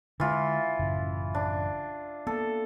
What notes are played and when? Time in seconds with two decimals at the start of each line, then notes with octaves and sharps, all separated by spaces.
0.20 D3 E3 G#3 F4
0.79 A1 F#2 C#3
1.35 D4
2.27 A#3 B3 A4